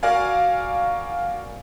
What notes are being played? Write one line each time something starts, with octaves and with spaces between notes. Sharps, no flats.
F#4 A#4 D5 F5 G#5